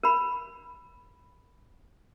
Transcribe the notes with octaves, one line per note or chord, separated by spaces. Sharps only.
A#4 B5